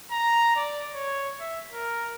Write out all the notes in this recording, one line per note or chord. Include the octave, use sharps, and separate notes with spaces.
A#5
D5
C#5
E5
A#4